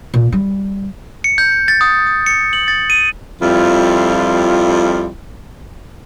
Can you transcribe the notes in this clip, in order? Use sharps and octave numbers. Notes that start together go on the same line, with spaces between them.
A#2
G3
C#7
G6
C#7
A6
D#6
D#6
C#7
F#7
A6
D#7
F2 G3 E4 F4